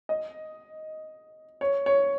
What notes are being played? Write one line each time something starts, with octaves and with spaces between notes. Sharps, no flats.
D#5
C#5
C#5